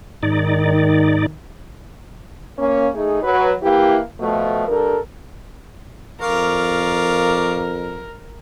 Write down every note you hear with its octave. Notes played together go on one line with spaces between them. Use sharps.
G#2 D#3 D#4 D5
A#3 C#4
A3 D#4 G#4
F#3 B4
E3 A#3 E4 G4
B2 F3 A3
G2 A4 A#4
F2 A#4 D5 F5 C#6